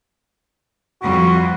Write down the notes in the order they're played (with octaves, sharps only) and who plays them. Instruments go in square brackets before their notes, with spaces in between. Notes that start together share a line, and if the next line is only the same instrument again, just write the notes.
[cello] F2 G3 [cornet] F#4